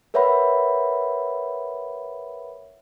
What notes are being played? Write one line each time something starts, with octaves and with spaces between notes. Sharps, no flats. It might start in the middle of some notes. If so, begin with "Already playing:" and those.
A#4 B4 C#5 E5 F#5 B5